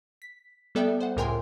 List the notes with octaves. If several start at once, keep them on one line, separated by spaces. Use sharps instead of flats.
B6
G3 B3 A4 D5 E5 G5
C5 F#5
C#2 A2 A#4 G5 G#5 C6